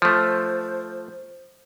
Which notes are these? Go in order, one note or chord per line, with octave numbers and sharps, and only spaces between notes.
F3 A3 C5